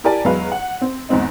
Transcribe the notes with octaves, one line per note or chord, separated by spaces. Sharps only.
E4 G4 A#4 D5 G#5 A5
E2 F#3 G#3 B4 F5
F#5
C4
E2 G#2 C4 D#4